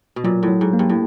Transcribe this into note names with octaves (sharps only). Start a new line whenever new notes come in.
B2
A#2 F#3
A2
F#3
G#2
A#3
G2
A2